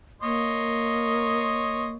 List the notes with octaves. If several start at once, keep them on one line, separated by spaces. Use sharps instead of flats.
A#3 C#5 D#5 C6